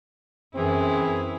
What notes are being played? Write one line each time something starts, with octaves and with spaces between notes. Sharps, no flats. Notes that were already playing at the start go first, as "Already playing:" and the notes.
F#2 E3 C4 E4 G#4